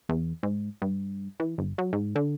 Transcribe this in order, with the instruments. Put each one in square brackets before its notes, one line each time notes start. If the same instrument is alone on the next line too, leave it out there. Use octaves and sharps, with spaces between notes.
[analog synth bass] E2
G#2
G2
E3
G1
F#3
G#2
D3